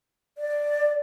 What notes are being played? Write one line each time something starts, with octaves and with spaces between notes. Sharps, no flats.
D5